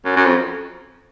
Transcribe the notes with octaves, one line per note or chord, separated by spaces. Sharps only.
F#2
F#2
F2